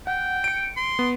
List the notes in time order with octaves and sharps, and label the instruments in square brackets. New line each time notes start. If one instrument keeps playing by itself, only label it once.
[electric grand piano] F#5 [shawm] G5
[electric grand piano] C#7 D7
[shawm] C6
[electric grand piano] B3